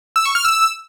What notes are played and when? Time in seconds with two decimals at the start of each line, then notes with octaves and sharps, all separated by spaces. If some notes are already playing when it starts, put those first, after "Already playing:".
0.16 E6
0.25 C#6
0.35 F6
0.45 E6